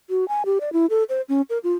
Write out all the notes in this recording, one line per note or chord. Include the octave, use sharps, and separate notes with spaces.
F#4
G#5
G4
D5
E4
A4
C5
C#4
A#4
F4